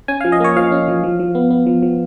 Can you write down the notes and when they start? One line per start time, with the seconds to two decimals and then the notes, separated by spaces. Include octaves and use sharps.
0.08 C#4 G#5
0.21 F3 F5
0.32 D#5
0.40 A#3 C#5
0.56 F3 F5
0.72 C#4
0.88 F3
1.03 F3
1.20 F3
1.35 B3
1.50 B3
1.66 F3
1.83 F3